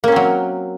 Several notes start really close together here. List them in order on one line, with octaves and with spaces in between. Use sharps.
A#3 C#4 C4 F#3